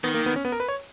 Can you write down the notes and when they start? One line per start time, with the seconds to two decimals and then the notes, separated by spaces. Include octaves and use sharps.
0.04 D#3 B3
0.14 A#3
0.26 B3
0.36 C#4
0.45 B3
0.52 A#4
0.60 B4
0.68 C#5